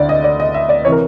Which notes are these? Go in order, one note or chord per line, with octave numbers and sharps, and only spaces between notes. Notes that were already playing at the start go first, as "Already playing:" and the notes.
Already playing: D2 D3 D5
D#5
D5
D#5
E5
D5
C3 E3 C#5
A#4